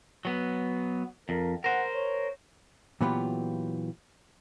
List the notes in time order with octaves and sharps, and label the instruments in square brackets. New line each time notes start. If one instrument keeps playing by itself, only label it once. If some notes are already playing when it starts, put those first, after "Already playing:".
[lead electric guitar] F#3 B3
[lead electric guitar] F2 [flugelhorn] A#4
[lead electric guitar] A#4 C5 [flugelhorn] F#5
[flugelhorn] C#5
[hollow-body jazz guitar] A#2 E3 F#3 B3 F4 G4